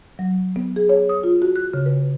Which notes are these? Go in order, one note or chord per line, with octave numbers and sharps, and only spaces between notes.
F#3
B3
G#4
C#5
D#6
F4
F#4
F#6
C#3
B4